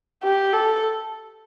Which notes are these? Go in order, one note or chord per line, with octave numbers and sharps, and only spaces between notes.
G4
A4